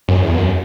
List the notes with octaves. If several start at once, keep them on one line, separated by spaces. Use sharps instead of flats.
F#2
E2
F#2